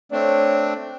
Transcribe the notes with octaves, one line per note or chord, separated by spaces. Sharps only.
A3 C4 D4 C#5